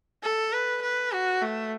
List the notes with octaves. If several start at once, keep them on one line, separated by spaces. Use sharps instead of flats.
A4
B4
B4
F#4
A3